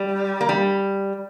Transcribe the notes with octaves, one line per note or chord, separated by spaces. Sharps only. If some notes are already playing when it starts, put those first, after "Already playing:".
Already playing: G3
A#3
G3